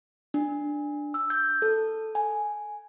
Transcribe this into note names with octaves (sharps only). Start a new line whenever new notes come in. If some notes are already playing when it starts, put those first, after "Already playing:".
D4
E6
G6
A4
G#5